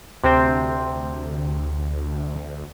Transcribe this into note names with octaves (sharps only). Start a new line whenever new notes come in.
D2 C3 C4 C5